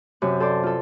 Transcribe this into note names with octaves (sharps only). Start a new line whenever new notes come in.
F#2 C3
A4 C5 D5
F4 A4